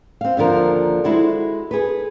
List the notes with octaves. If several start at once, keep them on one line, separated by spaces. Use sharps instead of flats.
C4 F5
D#2 D3 F3 A#4 F5
G#3 E4 F#4 A4 C5
G#4 A4 B4